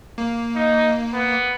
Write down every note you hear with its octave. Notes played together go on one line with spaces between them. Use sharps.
A#3
D#4
B3